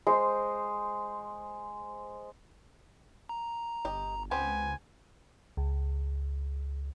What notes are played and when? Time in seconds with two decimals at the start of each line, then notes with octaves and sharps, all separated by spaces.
0.07 G#3 C5
3.29 A#5
3.85 G1 G4 D#5
4.31 C#2 B3 C4 G4 G#5
5.57 C#2